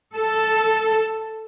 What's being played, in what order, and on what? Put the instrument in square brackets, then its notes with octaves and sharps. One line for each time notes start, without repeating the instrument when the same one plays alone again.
[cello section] A4